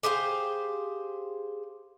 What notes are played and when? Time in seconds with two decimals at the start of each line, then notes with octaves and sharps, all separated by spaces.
0.03 G4 G#4 C5 F5